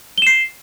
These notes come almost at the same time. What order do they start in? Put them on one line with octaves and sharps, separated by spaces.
G7 E7 C7